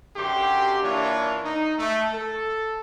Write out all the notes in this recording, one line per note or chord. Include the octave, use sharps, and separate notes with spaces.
F#2 D3 G4 G5 C6
E3 A#3 D4 F4 C#5
D#4
A3
A4